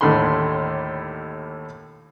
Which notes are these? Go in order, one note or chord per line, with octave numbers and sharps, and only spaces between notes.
D#2 A2 D3 B5 C6